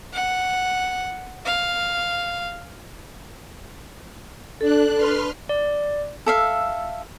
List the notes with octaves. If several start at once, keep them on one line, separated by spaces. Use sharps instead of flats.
F#5
F5
D4 A4 F#6
B4 C6 F6
D5
A4 E5 F5